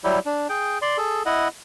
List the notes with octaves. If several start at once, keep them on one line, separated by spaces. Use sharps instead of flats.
F#3 G3 E4 G4
D4
G#4 G5
D5 C6
G#4 A4
E4 D#5 F#5